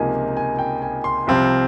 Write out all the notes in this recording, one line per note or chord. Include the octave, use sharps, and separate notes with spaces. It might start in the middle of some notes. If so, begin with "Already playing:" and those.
Already playing: C#2 C3 F3 A#3 D#4 G#5
G#5
G5
G#5
C6
C2 C3 F3 C4 F4